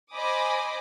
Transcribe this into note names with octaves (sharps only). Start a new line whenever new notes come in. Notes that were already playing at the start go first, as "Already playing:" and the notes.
C5 D#5 G#5 B5 D6 D#6